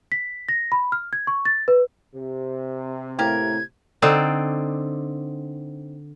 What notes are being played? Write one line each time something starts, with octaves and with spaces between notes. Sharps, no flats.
B6
A#6
B5
F6
G#6
C#6
A6
B4
C3
A2 A#3 G4 A#4 G#6
D3 C4 D#4 D5